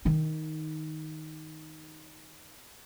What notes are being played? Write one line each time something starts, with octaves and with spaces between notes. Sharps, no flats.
D#3 D#4